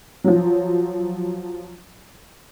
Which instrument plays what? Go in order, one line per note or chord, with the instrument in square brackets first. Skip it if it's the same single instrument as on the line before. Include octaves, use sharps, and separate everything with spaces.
[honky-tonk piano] F3 F#3